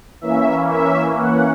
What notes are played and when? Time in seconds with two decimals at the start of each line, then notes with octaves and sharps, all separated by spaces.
0.21 E3 A#3 C#4 E5
0.69 E5
1.16 F#5